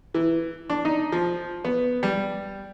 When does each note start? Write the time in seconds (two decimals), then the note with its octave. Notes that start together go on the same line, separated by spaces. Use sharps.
0.14 E3
0.69 D4
0.85 D#4
1.12 F3
1.65 B3
2.03 G3